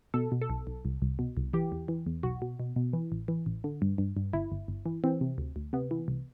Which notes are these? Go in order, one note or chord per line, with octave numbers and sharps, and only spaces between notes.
B2 A4
B2
A4
B1
B1
C2
C2
B2
C2
E3 G4
E2
E3
E2
B1 F#4
B2
B2
B2
E3
A1
E3
A1
D3
G2
G2
G2
G1 E4
G1
G1
E3
E3 C4
C3
D2
D2
C3 B3
E3
C2